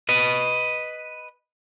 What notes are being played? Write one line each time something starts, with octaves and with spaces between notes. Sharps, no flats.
B4 D#5